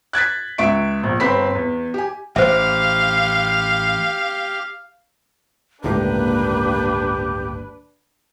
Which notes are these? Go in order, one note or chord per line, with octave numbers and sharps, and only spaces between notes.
F#6 G#6 A6 B6
C#2 E5 C#6 D7
A#1
G1 C4 B5 B6
E2
G4 G#5
A1 G4 C5 E5 F5
G1 C#2 A2 A#3 D4 G4 B4